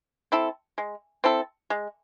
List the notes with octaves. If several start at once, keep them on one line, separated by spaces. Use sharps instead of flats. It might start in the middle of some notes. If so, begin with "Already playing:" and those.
C4 E4 A4
G#3
C4 E4 A4
G#3